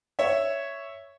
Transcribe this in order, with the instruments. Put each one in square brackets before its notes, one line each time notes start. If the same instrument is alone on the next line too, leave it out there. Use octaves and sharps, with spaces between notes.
[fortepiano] C#5 E5